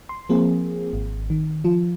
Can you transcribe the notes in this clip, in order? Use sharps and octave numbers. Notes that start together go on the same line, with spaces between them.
C6
F3 A#3 C4 G#4
G#1
D#3
F3 F4